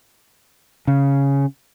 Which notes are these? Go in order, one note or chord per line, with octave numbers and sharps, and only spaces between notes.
C#3